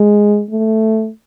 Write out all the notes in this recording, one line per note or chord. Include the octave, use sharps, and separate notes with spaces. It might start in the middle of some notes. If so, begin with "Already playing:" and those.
Already playing: G#3
A3